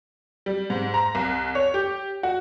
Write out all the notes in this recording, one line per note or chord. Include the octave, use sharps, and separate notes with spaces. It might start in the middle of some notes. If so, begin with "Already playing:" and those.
G3
G#2
A#5
C2
C#5
G4
F#4